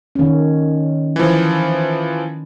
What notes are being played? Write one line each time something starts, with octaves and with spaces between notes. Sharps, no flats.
D#3 C#4
E3 F3